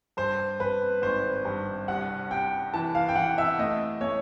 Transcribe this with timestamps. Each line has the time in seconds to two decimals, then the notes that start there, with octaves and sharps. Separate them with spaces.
0.17 G2 C5
0.60 G2 B4
1.02 G#1 C5
1.45 G2
1.88 C2 F#5
2.31 C2 G5
2.74 E3 A5
2.95 F5
3.09 G5
3.16 E3 F#5
3.38 E5
3.59 A3 D#5
4.01 A3 C#5